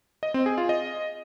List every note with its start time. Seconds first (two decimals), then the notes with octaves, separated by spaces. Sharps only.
0.23 D#5
0.34 C4
0.46 G#4
0.58 F4
0.69 D#5